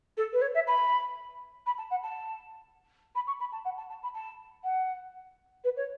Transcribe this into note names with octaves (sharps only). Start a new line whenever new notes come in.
A4
B4
C#5
E5
B5
B5
A5
F#5
A5
B5
C#6
B5
A5
F#5
A5
A5
B5
A5
F#5
B4
C#5